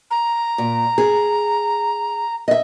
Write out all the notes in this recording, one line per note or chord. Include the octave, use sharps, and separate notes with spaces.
A#5
A#2
G#4
D#5 E5